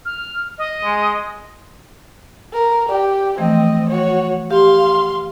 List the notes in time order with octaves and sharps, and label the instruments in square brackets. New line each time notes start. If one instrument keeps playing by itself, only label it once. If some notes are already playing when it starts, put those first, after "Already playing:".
[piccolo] F6
D#5
[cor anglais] G#3
[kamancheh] A#4
[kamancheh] G4 [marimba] D5
[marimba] E3 F3 A3 [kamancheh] C4 D#5
[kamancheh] F#4 C#5
[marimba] G4 [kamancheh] F5 C6